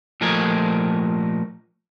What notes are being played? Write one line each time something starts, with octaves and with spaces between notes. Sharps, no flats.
A#2 F3 A3 A#4 D#5 G#5